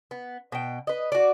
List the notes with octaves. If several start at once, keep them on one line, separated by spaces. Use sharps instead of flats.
B3
B2 G5
B4 D#5
F#4 D5